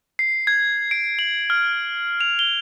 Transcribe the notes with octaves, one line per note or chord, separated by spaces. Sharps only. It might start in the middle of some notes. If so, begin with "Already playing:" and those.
C7
G#6
D7
F#7
F6
F7
G7